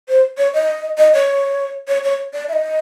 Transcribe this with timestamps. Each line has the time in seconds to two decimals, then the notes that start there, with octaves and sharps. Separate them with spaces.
0.09 C5
0.38 C#5
0.54 D#5
0.98 D#5
1.14 C#5
1.88 C#5
2.03 C#5
2.33 D5
2.49 E5
2.53 D#5